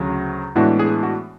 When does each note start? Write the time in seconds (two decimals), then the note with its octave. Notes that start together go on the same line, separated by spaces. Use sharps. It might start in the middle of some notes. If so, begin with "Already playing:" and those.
Already playing: D2 C#3 F#3
0.55 A2 E3 G#3 B3 D4 F#4
0.79 G#4
1.03 F#4